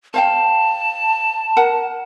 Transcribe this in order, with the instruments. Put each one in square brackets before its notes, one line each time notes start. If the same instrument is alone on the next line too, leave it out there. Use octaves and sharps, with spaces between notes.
[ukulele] C5 F5 G5 [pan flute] A5
[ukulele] A#4 F#5